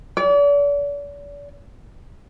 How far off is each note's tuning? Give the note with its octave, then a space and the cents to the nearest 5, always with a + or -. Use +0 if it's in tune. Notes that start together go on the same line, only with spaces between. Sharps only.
D5 -40